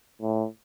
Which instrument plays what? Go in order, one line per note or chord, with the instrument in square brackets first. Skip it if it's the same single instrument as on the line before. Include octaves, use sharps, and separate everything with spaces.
[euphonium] A2